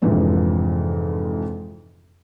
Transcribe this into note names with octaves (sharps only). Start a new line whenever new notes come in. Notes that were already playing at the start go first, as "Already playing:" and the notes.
F2 G#2 C3 E3 F3 D4